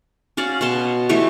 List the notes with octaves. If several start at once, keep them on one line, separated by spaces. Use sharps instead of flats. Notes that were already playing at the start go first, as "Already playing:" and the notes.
C#4 F#4 D5 F5
B2 C#5 A5 C6
E3 A3 G4 C#5